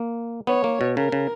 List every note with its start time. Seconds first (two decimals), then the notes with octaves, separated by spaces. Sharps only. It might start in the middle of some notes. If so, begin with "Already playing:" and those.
Already playing: A#3
0.47 B3 C#5
0.64 A#3
0.81 B2
0.96 C#3 A#4
1.12 C#3